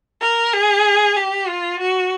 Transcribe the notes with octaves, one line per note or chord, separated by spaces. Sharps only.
A#4
G#4
G4
F4
F#4